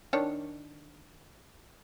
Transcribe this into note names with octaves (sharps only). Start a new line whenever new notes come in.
D#3 D4 C#5